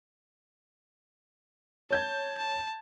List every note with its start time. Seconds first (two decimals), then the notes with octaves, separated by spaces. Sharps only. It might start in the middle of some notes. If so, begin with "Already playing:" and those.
1.91 C#5 A5 G6 G#6
2.37 A5